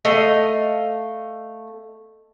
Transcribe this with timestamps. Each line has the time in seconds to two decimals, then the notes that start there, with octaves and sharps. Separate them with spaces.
0.05 A3 D#5 F5